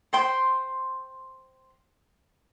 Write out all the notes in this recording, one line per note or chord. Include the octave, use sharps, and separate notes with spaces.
C5 G5 C6